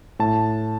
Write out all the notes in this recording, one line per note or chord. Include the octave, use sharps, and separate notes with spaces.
A2 A5